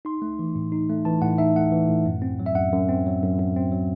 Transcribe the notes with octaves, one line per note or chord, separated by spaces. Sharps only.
D#4 C6
A3
E3
A2
D#4
A3
E3 A5
A2 F#5
D#4 E5
A3 F#5
E3
A2
F#2
C4
F#3
E5
F#2 F#5
F#2
C4
F#3
F#2
F#2
C4
F#3